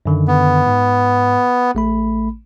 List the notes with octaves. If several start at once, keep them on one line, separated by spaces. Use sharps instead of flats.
F#2 D3 D#3
B3
G#2
A1 A3 B5